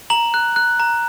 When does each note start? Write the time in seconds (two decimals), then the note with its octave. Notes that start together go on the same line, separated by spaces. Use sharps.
0.10 A#5 F#7
0.34 F#6
0.56 F#6
0.80 A#5